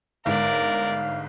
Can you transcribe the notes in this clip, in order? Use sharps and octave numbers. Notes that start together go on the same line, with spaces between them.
G1 G#2 A#4 D5 F5